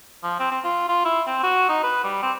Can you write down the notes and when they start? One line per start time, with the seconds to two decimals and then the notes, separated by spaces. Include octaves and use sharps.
0.23 F3
0.40 C4
0.51 C4
0.64 F4
0.89 F4
1.05 E4
1.27 C4
1.43 F#4
1.69 D#4
1.83 B4
2.04 G3
2.22 C4